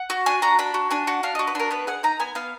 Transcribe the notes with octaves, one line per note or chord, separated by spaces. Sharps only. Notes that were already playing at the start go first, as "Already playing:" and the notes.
Already playing: F#5
F#4
D4 G#5
F#4 A#5
D4 B5
F#4
D4 G#5
F#4 F#5
D4 F5
F#4 D#5
B4
D4 A#4
B3 B4
G#4 F#5
D#4 A#5
B3 G#5
B3 F5